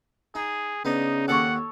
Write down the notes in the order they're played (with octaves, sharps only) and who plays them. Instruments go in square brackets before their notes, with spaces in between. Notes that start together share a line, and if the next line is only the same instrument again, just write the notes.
[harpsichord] D#4 [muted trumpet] G#4
[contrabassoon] C#3 [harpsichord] B3 D4 [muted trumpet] D#4
[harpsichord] D#2 D5 D6 [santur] A4 C#5 [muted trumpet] F#5